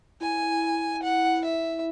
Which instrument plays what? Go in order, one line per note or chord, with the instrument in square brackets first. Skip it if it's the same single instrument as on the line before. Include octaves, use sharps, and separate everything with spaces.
[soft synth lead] E4 [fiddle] G#5
[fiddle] F#5
E5